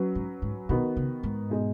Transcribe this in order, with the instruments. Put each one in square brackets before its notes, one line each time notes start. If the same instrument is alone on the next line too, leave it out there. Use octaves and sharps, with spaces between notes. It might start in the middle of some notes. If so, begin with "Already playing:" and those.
Already playing: [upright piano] F#3 C#4 F#4 B4
[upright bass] G#2
G#2
[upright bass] B2 [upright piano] D#3 B3 F#4
[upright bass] C#3
G#2
[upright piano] B2 G#3 D#4